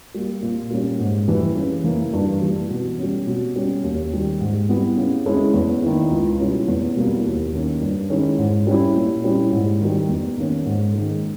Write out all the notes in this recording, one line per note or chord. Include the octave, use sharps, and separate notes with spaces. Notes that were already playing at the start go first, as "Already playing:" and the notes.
G3 A#3
A#2
G3 A#3 C#4
G#2
E3 G3
C#3
E3 A#3
G2
E3 G3
B2
G3 C#4
B2
G3 C#4
D#2
D#3 G3
G#2
G3 B3 E4
C#3
G#3 C#4 E4
E2
D#3 A#3 E4
C#2
B2 G3 C#4 E4
E2
B2 G3 A#3 E4
D#2
D#3 A#3 C#4
G2
D#3 G#3 C#4 E4
G#2
G3 C#4 E4
A#2
G3 C#4 E4
G#2
D#3 G3
E2
D#3 A#3 C#4
G#2
D#3 G#3